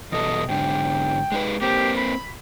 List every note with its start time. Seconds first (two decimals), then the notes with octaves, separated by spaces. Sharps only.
0.12 E2 B2 A4 D#5
0.49 G#2 D3 G5
1.32 G#3 D#4 B4
1.62 A#3 C4 G4
1.98 B5